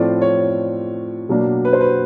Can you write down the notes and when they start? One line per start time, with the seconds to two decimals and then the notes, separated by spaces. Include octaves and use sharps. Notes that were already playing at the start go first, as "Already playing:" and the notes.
Already playing: A2 F3 A3 C4 F4 D5
0.22 C#5
1.29 B2 F#3 A#3 D4
1.65 B4
1.73 C5
1.81 B4